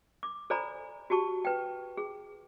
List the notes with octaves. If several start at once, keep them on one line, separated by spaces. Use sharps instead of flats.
D6
A4 C5 D5 G#5 A#5 B5
F#4 G4 A5 C#6
B4 G5
G#4